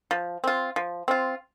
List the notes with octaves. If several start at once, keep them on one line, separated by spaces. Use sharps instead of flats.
F3
C4 F4
F3
C4 F4